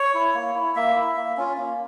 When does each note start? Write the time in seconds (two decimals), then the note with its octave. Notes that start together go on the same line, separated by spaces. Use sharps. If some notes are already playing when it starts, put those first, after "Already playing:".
Already playing: C#5
0.14 E4
0.35 A#3
0.55 E4
0.75 A#3 E5
0.96 E4
1.16 A#3
1.37 C#4 F4
1.57 A#3